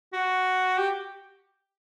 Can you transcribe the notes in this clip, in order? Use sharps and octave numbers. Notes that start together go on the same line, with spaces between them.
F#4
G4